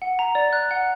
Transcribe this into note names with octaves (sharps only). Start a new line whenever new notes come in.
F#5
A#5
D5
F#6
F#5